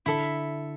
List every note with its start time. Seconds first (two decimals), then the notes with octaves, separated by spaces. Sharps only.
0.06 D3 E4 A4 E5